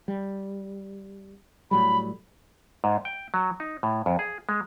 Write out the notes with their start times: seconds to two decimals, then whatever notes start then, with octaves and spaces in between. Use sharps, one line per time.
0.08 G3
1.71 A2 F#3 G3 B5
2.84 G#2
3.05 G5
3.34 F#3
3.60 D#4
3.83 A2
4.06 F2
4.19 G#4
4.49 G#3